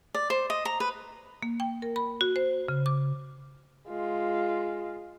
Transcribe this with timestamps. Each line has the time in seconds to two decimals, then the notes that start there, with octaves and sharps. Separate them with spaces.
0.14 D5
0.30 C5
0.50 D#5
0.65 A#5
0.80 B4
1.43 A#3
1.60 G5
1.82 A#4
1.96 B5
2.21 F#4
2.36 C5
2.68 C#3
2.86 D6
3.88 G#3 F4